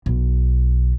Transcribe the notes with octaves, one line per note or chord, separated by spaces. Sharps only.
B1